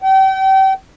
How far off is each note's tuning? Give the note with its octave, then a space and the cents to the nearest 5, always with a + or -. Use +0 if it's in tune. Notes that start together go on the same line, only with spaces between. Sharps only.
G5 -35